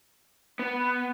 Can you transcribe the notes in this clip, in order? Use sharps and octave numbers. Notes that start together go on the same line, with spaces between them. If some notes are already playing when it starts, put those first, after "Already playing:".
B3